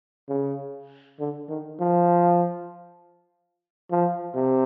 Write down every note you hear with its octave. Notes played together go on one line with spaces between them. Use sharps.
C#3
D3
D#3
F3
F3
C3